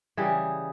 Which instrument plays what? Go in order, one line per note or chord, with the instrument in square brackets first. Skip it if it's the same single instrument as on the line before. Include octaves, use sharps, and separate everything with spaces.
[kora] C#3 E3 G3 G#4